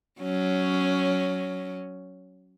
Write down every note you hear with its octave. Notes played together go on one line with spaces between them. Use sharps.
F#3 C#4